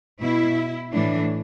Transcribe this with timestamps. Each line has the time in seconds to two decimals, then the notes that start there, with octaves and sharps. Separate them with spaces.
0.22 B2 E4
0.92 A2 E3 D4